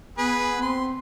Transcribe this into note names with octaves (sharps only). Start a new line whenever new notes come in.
B3 G#4 B4
C4 C6